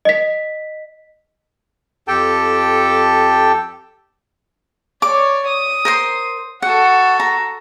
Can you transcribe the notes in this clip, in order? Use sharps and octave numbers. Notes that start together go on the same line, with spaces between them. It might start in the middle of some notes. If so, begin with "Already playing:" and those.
D#5 B6
F2 G4 A4 G5 A5
C#5 D5 D6
D#6
A#4 C5 C6
F#4 A4 F#5
A#5